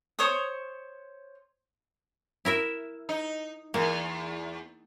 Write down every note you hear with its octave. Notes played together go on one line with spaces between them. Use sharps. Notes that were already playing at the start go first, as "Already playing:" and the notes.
C5 C#5 C#6 D#6
E4 A#4 E5
D#4
E2 A#3